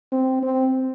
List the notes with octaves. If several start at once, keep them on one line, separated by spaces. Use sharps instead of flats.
C4
C4